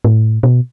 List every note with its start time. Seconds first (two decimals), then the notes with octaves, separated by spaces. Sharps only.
0.05 A2
0.43 B2